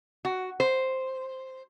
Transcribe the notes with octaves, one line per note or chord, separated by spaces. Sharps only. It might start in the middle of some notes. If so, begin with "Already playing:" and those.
F#4
C5